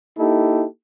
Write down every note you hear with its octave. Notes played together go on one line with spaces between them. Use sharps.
A#3 D#4 E4 G4 A4